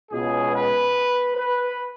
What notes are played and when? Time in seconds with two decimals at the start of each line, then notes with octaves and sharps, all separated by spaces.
0.11 C#2 B2 G#4
0.53 B4
1.37 B4